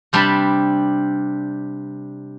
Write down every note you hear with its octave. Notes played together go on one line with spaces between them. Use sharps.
C3 G3 D4 A5 B5